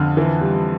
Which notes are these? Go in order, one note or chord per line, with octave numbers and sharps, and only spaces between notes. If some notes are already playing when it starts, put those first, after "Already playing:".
Already playing: F2 D3 F6
E3
G3